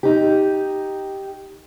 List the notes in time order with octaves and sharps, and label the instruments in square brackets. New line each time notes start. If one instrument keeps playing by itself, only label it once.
[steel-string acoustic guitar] D#4 G4